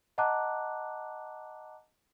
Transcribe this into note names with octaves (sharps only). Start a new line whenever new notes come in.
D#5 F#5 A5 A#5 D6 F#6